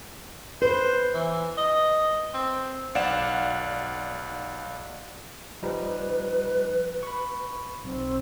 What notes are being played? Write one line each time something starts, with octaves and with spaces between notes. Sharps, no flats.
B4 C5
E3
D#5
C4
B1 D5 F5 F#5 E7
F3 G3 D#4 B4
B5 C#6
B1 C4